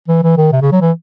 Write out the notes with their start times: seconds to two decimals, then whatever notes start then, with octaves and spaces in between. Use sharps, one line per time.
0.08 E3
0.23 E3
0.37 D#3
0.52 C3
0.62 C#3
0.72 F#3
0.81 E3